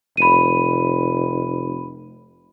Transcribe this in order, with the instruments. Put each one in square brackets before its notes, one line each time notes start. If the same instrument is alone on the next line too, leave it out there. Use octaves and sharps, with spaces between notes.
[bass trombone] F1 [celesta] B5 D#7